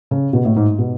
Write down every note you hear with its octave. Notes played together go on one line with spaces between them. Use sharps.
C#3
B2
A2
G#2
B2